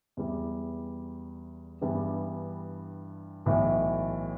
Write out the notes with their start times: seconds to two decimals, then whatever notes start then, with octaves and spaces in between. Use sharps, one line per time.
0.17 E2 E3 G3
1.81 G2 E3 G3 B3 D4
3.46 B1 A2 E3